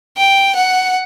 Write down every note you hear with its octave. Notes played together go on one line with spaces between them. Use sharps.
G5
F#5